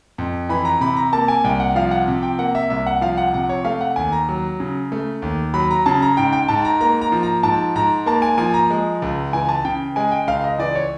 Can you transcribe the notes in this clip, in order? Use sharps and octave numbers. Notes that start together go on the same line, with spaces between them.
F2
E3 B5
A#5
C3 B5
A#5
A#3 A5
G#5
C2 G5
F#5
F3 F5
F#5
C3
G5
A#3 F#5
E5
C2 E5
F#5
F3 F5
F#5
C3 F#5
C#5
A3 F5
F#5
D#2 G#5
A#5
F#3
C#3
A3
D#2
F#3 B5
A#5
C#3 A5
A#5
G#2 G5
G5
G#2 A5
A#5
A#3 A#5
A#5
F3
A#5
G#2 A5
G#2 A#5
A#3 A5
G#5
F3 G#5
A#5
G#3
C#2
E3 G#5
A5
C#3 G5
G#3 G#5
G5
C#2 F5
D#5
E3 D5
C#5